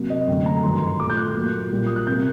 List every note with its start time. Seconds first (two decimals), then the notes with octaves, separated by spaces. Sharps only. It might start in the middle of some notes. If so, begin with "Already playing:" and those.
Already playing: C3 F#3 A#3
0.10 D#5
0.27 F#2 G5
0.30 D3 A3
0.46 A#5
0.63 G2 D#3 F#3 C6
0.76 C6
0.88 C6
1.00 A#2 A3 D6
1.10 G6
1.17 F#6
1.35 A#2 F#3 A#3
1.70 A#2 G3 A#3
1.87 D#6
1.96 F#6
2.07 C3 G3 A#3 G6